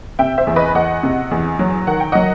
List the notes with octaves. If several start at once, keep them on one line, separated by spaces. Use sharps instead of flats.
C3 E5 G5
C5 E5
E2
B4 D#5
E2 D#5 F#5
C3
E2
F#3
D#3 F#5
G5
F#3 D#5 F#5